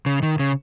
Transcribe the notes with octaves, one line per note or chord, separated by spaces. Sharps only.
C#3
D#3
C#3